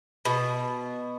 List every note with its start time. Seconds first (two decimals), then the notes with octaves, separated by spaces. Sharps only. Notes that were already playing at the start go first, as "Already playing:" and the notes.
0.25 B2